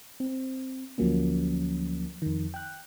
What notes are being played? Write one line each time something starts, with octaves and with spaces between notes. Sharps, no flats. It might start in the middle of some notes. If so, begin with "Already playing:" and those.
C4
D2 F3 F#3 A#3 C#4
F2 D#3
G5 F#6